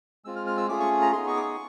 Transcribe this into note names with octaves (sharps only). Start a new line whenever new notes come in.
G#3 C4 F4 E6
F6
F6
E6
A3 C#4 F4 G#4 D6
C#6
A#5
B3 D#4 G#4 C6
C#6
D6
C#6